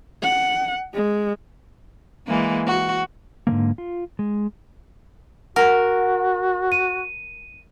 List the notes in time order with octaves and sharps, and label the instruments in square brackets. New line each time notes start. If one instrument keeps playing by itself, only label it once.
[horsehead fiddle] F#5
G#3
[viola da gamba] E3 G#3 A#3
F#4
[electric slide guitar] G#2 D3 E3 A#3
F4
G#3
[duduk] F#4 [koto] A#4 [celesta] F#5
[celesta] D#7